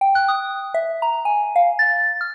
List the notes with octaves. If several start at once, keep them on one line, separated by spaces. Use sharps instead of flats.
G5
F#6
D#6
E5
A#5
G#5
F5
A6
F6